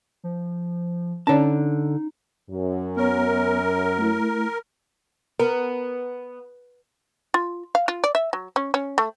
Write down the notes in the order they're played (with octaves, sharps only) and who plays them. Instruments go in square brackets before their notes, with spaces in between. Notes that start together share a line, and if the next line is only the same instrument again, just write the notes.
[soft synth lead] F3
[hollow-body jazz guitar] D3 A5 [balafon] C#4 C#5 D5 [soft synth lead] D#4
[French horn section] F#2
[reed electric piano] B3 C#5 [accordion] A#4
[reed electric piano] A3 E4
[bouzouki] B3 [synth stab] A#4
[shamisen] F4
F5
F4
D5
E5
F#3
C#4
C#4
A3